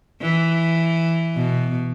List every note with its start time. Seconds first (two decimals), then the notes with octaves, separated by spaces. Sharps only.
0.22 E3
1.35 B2